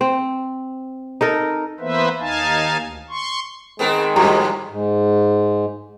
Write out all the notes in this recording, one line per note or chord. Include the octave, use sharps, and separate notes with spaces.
C4
D#4 A4 A#4
E3 A#3 B3 B4 C5 E5
D#2 D#4 F5 G#5 A5
D2
C6 C#6
D#3 G#3 B3 C4 A#4
G#2 F3 G3 A#3 F#4 A#5 B5
G#2